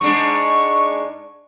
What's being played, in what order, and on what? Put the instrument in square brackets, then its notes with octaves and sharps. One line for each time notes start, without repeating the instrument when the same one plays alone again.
[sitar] G#2 G#3 D4 [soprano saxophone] C#6